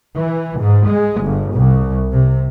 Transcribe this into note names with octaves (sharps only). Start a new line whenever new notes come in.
E3
G#2
G#3
G1
C2
C3